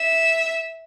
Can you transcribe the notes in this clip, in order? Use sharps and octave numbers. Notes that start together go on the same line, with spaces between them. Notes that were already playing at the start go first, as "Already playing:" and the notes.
Already playing: E5